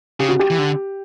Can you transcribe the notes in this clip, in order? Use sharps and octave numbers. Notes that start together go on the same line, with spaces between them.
C#3 G4
F#4
G4
E3
D3